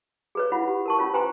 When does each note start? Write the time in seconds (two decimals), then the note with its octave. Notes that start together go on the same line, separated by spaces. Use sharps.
0.35 G#4 B4 C#5
0.52 E4 F4 F#5 B5
0.67 G4
0.86 A#4 A5 C#6
0.98 C#4 F4 C#5
1.14 B4 C5 G5 G#5 A#5 C6